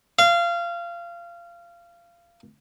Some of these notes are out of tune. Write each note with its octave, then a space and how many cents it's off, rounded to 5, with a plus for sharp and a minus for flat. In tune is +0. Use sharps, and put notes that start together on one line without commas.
F5 -25